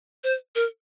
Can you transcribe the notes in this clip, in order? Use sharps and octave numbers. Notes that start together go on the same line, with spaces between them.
C5
A#4